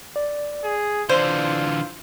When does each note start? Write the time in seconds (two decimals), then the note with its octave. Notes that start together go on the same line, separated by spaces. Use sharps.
0.16 D5
0.63 G#4
1.09 D3 E3 F4 C5 D5